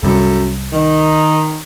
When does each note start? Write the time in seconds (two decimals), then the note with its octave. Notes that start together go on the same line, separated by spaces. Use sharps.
0.03 C2 F#2 G3 A3 A4
0.73 D#3